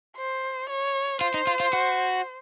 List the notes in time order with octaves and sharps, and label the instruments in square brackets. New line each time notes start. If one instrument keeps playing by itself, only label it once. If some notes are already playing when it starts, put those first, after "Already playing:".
[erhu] C5
C#5
[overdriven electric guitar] F4 [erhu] C5
[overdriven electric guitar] D#4
F4
F4
F#4